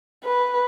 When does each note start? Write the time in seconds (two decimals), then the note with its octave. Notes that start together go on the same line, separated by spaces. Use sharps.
0.25 B4